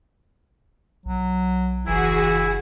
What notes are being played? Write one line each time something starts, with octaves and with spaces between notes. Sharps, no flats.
B1 F#3
F#1 E3 E4 F#4 G#4